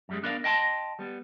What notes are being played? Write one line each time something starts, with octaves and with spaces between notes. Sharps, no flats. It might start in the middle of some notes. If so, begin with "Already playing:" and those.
F#2 G3 G#3
B3 D4 E4 A#4 D5 F5
D#5 G5 A5 B5 C6
G3 B3